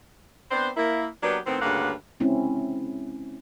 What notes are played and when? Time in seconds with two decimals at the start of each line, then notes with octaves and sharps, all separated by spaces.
0.51 B3 C4 D4 C5
0.77 A#3 E4
1.23 F#3 A#3 B3 D4 G4 B4
1.46 A2 D#3 B3 C4
1.62 D2 G2 C#3 A#3 B4 F#5
2.20 G#3 C4 C#4 E4